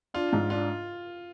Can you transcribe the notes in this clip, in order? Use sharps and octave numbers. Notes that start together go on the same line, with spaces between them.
D4 F4
G#2
D4 F4